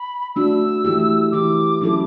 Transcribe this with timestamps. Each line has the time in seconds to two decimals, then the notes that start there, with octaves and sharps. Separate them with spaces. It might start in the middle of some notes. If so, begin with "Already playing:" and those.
Already playing: B5
0.36 A3 D4 F#4 E6
0.84 E3 A3 E4 G4
1.32 E3 A3 E4 G4 D6
1.81 F#3 C#4 E4 A4